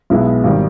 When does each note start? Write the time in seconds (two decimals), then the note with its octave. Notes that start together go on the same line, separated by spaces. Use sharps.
0.10 B1 B2 G#3 B3 E4
0.43 G#1 D#3 G3